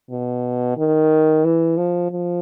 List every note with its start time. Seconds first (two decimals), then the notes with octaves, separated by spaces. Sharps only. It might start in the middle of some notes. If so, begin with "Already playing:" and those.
0.10 B2
0.77 D#3
1.44 E3
1.78 F3
2.11 F3